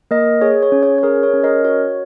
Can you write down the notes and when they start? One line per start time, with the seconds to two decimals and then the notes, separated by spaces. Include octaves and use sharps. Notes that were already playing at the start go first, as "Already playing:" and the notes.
0.11 A#3 A#4 D#5
0.41 G#4 C#5
0.63 C#5
0.72 C#4
0.83 C#5
0.98 C#5
1.03 G#4 A#4
1.23 C#5
1.34 C#4
1.43 A#4 D#5
1.64 F#4 C#5